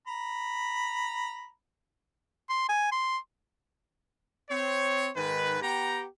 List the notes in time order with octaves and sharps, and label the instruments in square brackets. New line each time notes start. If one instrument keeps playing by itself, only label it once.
[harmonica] A#5 B5
[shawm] C6
G#5
C6
[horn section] C4 C#5
G#2 D#3 B4
B3 G4 G5 A#5